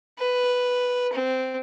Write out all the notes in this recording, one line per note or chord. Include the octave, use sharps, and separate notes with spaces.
B4
C4